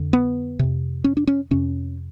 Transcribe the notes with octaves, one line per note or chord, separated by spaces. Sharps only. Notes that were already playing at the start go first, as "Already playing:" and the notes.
Already playing: F2 D3
B3
F2 C3
C#4
D4
C#4
F2 C3 C#4